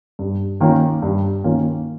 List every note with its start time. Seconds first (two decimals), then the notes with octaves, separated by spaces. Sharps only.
0.19 G2
0.60 D#3 A#3 C#4 F4
1.02 G2
1.44 D#3 A#3 C#4 F4